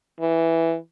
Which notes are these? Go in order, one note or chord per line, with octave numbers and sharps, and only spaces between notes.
E3